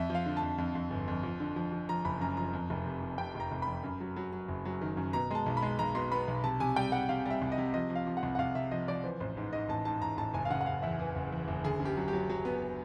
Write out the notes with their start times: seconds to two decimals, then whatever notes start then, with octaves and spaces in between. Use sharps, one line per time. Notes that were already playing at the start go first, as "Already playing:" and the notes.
Already playing: F2 E5
0.10 F3
0.15 F5
0.26 D3
0.37 F2 A5
0.58 F2
0.75 F2
0.90 G1
1.08 F2
1.23 F3
1.40 D3
1.56 F3
1.72 F3
1.89 F3 A#5
2.05 F#1 B5
2.21 F#2 A#5
2.37 F3 A#5
2.53 F2
2.70 F1
2.86 C3
3.03 C3
3.18 C3 G5
3.35 F1 A#5
3.52 F1
3.62 B5
3.67 F2
3.83 F#2
4.01 F#3
4.16 F#3
4.33 F#3
4.48 F#1
4.65 F#3
4.81 D#3
4.97 F#2
5.13 B2 A#5
5.31 G#3 A5
5.46 B1
5.57 B5
5.62 G#3
5.79 B1 A#5
5.95 B2 C6
6.12 B3 B5
6.28 B1
6.44 C3 A5
6.60 C3 G#5
6.76 G3 G5
6.92 G3 F#5
7.09 C3 F5
7.26 G3 E5
7.42 C2
7.52 D#5
7.58 C3
7.74 F3 D#5
7.90 F3
7.96 F5
8.07 F3
8.17 F#5
8.23 C2
8.35 F#5
8.39 C2 F5
8.55 C3 E5
8.71 F3 D#5
8.88 F3 D5
9.04 E3 C5
9.20 A1 C5
9.37 G#2
9.53 G#2 D#5
9.69 A1 A5
9.85 G#2 A5
10.02 A1 A#5
10.17 A1 A5
10.34 F#1 G#5
10.45 F5
10.50 C#3 F#5
10.61 F#5
10.66 F#1 F5
10.82 E2 E5
10.99 E3
11.16 F#1
11.32 E2
11.48 F#1
11.64 D2 G#4
11.80 C#3
11.85 G4
11.97 F#3
12.08 G4
12.13 F#3
12.30 F#3
12.45 B3